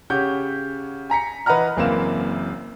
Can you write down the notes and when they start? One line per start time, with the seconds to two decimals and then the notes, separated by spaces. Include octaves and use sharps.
0.10 C#3 G4 C#5 F#5 G6
1.10 G#5 A#5 B6 C#7
1.46 E3 B4 D#5 F#5 A#5 F6
1.77 F#1 E3 A#3 C4 F5 E7